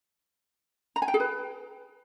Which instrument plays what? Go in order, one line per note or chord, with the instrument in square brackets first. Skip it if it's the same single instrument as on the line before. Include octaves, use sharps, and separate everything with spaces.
[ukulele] A#5
G#5
G5
G#4
B4